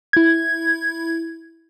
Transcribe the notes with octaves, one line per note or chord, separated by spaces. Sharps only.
E4 G#6